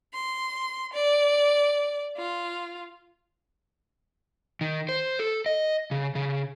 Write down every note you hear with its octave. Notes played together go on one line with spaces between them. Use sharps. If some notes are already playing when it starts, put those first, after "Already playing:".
C6
D5
F4
D#3
C5
A4
D#5
C#3
C#3